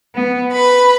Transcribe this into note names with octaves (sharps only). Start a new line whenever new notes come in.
B3
B4 B5